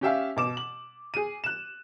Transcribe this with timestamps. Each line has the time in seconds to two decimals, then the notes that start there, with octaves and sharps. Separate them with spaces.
0.01 C#4 G4 E5 F5
0.37 B2 D6 E7
0.57 F#7
1.14 G#4 D#7
1.44 F#6 E7